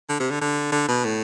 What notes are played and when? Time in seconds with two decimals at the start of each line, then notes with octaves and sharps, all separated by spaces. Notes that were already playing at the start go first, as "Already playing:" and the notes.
0.09 D3
0.20 C3
0.31 D3
0.41 D3
0.72 D3
0.88 B2
1.05 A2